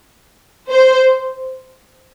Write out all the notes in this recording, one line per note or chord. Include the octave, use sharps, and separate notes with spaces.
C5